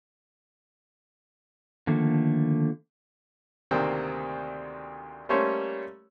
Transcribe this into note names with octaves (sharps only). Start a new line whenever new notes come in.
D3 D#3 F3 A3 A#3
D2 C3 D#3 A#3 C4
G3 A3 A#3 C#4 C5 C#5